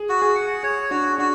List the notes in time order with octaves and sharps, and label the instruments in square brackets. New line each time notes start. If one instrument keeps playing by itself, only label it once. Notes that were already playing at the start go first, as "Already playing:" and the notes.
Already playing: [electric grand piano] G#4
[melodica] F#4
[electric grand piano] G#4
[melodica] F#5
[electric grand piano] G#4 [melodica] C#5
[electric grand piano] D4 [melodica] F#4
[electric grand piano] D4 [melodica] F#4